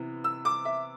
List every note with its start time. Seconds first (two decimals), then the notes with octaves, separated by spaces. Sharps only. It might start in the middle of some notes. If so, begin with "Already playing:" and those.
Already playing: C3 E3 B3
0.24 E6
0.45 D6
0.65 E5